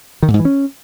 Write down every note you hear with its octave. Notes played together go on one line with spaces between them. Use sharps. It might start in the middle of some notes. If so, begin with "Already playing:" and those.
D#3
A#2
G#2
E3
C#4